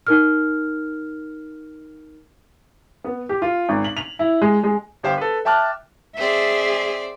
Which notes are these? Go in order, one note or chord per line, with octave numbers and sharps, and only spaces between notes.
D#4 A#4 F6
B3
G4
F4
G#1
F#7
F7
E4
G#3
G#3
G1 G4 C5 F5 G5
A4 B4
E5 G5 A5 D6 F6 F#6
C4 G#4 D5 E5